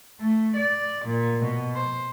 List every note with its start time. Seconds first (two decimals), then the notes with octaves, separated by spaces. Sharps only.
0.20 A3
0.56 D5
1.05 A#2
1.40 B2
1.74 C5